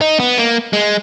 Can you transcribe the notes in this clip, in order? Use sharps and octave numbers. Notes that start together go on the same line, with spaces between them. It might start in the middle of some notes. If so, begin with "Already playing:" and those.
D#4
B3
A#3
G#3